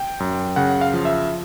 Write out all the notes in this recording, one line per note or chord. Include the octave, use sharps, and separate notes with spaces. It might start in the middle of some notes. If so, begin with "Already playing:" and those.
Already playing: G5
F#2
C#3 F#5
F5
F3
E5